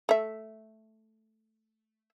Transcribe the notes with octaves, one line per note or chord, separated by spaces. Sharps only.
A3 E5